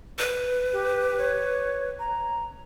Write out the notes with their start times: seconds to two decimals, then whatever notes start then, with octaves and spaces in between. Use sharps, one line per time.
0.18 B4
0.73 G4
1.18 C#5
1.99 A#5